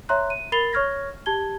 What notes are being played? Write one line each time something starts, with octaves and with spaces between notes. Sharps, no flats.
C#5 E5 A#5 C6 F#6
D#7
A#4 B5 A6 C7 F7 G7
C#5 C#6 F6 G#6 A#6
G4 A5 G#6 G7